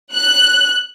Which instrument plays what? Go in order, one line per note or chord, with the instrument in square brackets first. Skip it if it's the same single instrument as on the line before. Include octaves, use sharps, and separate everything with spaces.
[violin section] F#6